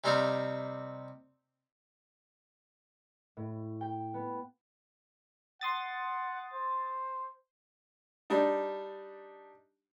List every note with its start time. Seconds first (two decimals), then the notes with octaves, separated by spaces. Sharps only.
0.04 C3 G3 C4 D#4 E5 F5
3.37 A2
3.81 G5
4.14 B3
5.61 F#5 C6 D#6 A6
6.53 C5
8.30 G3 D4 D#4